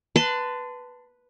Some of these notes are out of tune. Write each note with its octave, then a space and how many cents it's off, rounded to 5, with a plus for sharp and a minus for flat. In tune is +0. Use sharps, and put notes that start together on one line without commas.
B4 +0 A5 +15 C6 -30